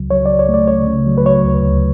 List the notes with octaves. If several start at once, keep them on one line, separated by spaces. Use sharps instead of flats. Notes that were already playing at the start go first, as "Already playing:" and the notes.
Already playing: C#2 C#3 F#3
F#3 C#5
C#2 D5
C#5
A3
D5
C#3 C#5
C#3
F#3
B4
F#3 C#5
D2
D2